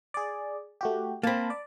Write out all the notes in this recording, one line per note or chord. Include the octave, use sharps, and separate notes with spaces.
G#4 D5
A3 F#4 G4
A#3 C4 A5 B5
D5